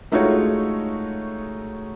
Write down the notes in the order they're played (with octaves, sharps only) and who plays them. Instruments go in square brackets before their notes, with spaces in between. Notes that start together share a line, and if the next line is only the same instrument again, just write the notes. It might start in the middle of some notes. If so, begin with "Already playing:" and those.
[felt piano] G#3 A3 D#4 F4 F#4 C#5